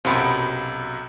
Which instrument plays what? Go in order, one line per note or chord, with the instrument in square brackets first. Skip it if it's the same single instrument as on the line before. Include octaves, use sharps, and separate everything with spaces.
[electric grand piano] B1 F#2 C3 [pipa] F3 B3 C4